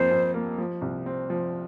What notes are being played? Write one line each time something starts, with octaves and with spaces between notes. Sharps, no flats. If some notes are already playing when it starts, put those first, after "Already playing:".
Already playing: F2 A#3 C5
F2
A#3
F3
C2
C4
F3